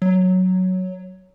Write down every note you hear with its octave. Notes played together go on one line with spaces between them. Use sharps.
F#3